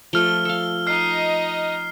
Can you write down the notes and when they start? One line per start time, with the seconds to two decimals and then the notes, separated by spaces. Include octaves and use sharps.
0.13 F3 A3 F6 G7
0.45 A4 F5
0.87 D#4 D#5 F6 C7